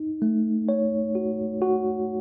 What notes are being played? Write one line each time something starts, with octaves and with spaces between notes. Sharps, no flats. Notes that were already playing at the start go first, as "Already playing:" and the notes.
Already playing: D#4
A3
C#5
F#4
F#4